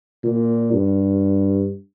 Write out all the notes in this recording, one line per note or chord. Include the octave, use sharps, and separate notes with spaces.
A#2
G2